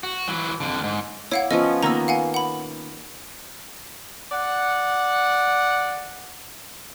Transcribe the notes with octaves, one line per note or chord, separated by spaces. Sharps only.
F#4
E3 F#3
F2 D3
D2 G#2
E4 C#5 F5 F#5 D6
F3 B3 C#4 D#5
D#3 A#3 B3 A#5 E6
F5 F#5 G#5
F#5 B5
D5 F#5